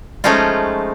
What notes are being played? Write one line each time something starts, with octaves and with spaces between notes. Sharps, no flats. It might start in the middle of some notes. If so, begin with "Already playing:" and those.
F3 G#3 A3 C#4 D#4 F4